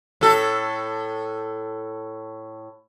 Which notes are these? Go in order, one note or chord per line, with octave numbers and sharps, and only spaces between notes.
A2 A4